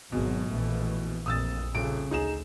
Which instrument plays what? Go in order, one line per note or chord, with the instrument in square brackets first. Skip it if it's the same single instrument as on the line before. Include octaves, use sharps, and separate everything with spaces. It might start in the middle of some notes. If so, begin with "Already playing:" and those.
[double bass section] G#1 F#3 G#3 [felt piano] B2
[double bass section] A#1 E3 A3
[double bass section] A#1 F2 [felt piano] D#6 E6 A6
[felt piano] D#1 D7 [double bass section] C#3
[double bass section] D2 [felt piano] D#4 G#4 E7